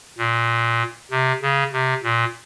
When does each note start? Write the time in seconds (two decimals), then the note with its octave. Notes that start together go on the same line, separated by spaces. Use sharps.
0.18 A#2
1.11 C3
1.42 C#3
1.72 C3
2.03 A#2